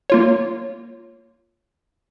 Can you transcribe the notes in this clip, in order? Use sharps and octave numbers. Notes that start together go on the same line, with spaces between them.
A#3 F4 C#5